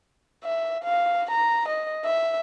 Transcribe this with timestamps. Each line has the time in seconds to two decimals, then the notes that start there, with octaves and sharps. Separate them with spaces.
0.44 E5
0.84 F5
1.31 A#5
1.69 D#5
2.05 E5